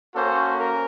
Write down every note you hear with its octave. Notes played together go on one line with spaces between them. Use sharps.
A#3 C#4 F#4 A4 C5
A#4